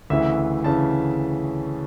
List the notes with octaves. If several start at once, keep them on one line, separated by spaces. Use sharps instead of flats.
D2 C#3 E3 E5
D2 C#3 E3 A5